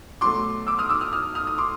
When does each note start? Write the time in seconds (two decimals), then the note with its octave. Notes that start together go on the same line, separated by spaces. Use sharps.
0.21 B2 F#3 A3 C6 D6
0.67 D6 E6
0.79 D#6 F6
0.89 D6 E6
1.01 D#6 F6
1.13 D#6 F6
1.35 D#6 F6
1.47 D#6
1.58 C6 D6